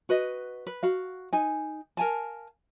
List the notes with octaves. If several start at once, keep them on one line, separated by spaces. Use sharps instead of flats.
F#4 B4 D#5
B4
F#4 F5
D#4 G#5
A#4 F5 G#5 A5